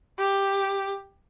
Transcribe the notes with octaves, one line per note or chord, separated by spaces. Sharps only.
G4